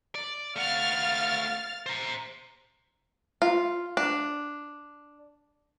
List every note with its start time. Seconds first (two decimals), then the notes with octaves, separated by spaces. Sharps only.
0.15 D5
0.56 A3 F5 F#5 F6 A6
1.86 C5 A#5
3.42 F4
3.97 D4